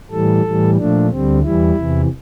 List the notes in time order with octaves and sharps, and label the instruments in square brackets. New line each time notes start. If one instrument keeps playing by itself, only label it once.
[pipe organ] A2 E3 G3 A4
A2 E3 G3
A#2 F3 A3 D4
D2 D3 G3 C4
E2 E3 G3 E4
E2 C3 E3